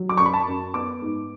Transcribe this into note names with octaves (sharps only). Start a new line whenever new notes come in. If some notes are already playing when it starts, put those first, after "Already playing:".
Already playing: F#3
D6
F#2 C#6
B5
A5
F#2
B3 D6
G#2